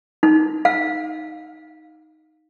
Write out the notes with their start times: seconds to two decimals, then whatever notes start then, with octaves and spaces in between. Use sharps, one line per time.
0.23 D#4
0.65 F5